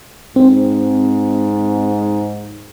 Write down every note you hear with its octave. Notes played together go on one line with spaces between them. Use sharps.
G#2 C4